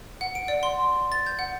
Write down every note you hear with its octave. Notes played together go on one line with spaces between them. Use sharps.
F#5
D7
D5
C6
A6
G6
F#5